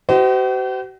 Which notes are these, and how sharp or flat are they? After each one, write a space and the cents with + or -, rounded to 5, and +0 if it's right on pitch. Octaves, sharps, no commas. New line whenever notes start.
F#4 +45 C5 -40 D#5 +0